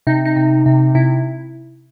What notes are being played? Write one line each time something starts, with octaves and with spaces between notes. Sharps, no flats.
C3 D#4
D#4
C3
C3
C3 E4